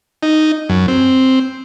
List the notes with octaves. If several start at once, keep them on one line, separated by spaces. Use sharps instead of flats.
D#4
F#2
C4